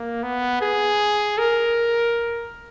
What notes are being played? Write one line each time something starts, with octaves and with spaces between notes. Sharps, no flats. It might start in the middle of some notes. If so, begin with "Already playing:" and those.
Already playing: A#3
B3
G#4
A#4